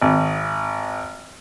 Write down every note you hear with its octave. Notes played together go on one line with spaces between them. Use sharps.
G#1